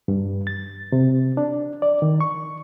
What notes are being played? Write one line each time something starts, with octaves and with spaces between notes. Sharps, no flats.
G2
A6
C3
D4
D5
D#3
C#6